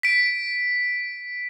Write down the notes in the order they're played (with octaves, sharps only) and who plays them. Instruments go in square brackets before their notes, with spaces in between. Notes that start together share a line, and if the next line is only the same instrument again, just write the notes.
[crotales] B6 D7